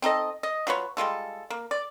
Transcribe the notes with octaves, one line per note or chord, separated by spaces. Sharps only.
C4 D#4 A4 D#5
D#5
F#3 F4 B4 C#5
G3 G#3 F4 A4
A#3
D5